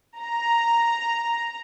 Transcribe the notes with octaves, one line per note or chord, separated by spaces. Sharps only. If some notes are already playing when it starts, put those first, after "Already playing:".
A#5